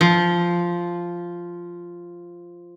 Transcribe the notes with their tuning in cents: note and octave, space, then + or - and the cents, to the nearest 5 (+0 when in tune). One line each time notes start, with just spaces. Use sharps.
F3 -5